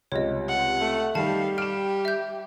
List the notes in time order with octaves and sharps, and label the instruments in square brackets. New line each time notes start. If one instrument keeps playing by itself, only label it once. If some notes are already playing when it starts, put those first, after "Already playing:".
[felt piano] C#2 C3 G3 [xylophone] C#5 D#5
[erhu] F#5
[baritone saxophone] A3
[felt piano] D#3 D#4 [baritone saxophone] G3 [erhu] F5 [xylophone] A5
[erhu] G4 [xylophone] F6 [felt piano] D7 E7
[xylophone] E5 G6